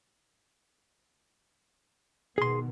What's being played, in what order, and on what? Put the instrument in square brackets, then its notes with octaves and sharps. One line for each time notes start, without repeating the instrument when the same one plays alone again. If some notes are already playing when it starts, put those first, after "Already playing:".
[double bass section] B2 D#3 B3 [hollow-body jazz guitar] G#4 C6